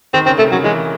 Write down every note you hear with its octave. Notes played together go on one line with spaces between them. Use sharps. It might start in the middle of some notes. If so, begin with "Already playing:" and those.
D#3 C4
C#3 C4
C3 A3
C#3 F#3
E3 G#3